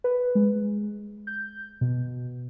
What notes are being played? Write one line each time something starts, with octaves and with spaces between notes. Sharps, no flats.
B4
G#3
G6
B2